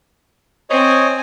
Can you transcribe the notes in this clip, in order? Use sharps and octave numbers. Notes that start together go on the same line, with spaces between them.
C4 C#5 D#5 G#5